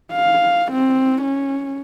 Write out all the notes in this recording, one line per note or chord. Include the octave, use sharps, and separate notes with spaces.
F5
C4
C#4